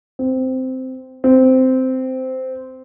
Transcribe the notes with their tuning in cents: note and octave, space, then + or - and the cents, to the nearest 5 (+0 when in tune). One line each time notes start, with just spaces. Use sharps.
C4 -10
C4 -10